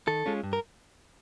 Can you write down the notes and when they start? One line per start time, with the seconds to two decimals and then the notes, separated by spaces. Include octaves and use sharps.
0.08 D#3 A4
0.26 G#3 C#4 F4
0.43 G2
0.53 A#4